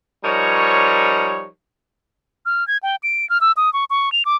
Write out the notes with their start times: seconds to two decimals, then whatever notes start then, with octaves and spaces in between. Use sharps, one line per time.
0.24 F3 G3 D#4 A#4 C#5
2.46 F6
2.68 G#6
2.83 G5
3.03 D7
3.30 F6
3.41 E6
3.57 D#6
3.73 C#6
3.90 C#6
4.12 F7
4.25 D6